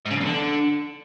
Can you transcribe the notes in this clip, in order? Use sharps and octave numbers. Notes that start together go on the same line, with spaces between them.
G#2
C#3
G2
E2
D3